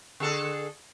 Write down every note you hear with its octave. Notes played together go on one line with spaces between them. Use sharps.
D3 G#4 A4